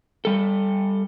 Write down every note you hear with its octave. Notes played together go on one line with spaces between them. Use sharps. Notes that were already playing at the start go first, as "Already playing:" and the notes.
G3 A4